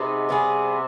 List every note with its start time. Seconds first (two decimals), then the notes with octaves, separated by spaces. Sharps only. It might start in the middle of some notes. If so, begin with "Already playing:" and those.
Already playing: C3 B3 D#4 G#4
0.29 G3 B3 D#4 G#4